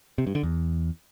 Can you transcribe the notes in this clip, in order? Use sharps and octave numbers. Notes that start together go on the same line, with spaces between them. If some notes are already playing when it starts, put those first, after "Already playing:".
C3
G2
D3
E2